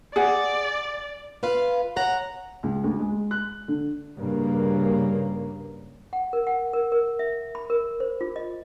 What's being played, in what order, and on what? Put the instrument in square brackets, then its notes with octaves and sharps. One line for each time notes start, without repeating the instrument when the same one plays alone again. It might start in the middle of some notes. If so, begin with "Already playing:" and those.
[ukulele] G#4 F#5 [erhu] D5
[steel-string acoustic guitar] F4 B4 F5
C#5 F#5 A#5
[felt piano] C#2
D2
G#3
F#6
D3
[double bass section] G2 C#3 A#3
[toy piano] F#5
A#4
F#5
A#4
A#4
E5
B5
A#4
C5
F4
D#5